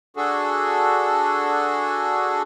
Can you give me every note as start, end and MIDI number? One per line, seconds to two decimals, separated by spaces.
0.17 2.42 62
0.17 2.42 66
0.17 2.42 68
0.17 2.42 69